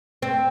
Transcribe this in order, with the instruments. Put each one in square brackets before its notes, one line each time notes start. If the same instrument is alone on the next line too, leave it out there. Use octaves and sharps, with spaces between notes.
[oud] C4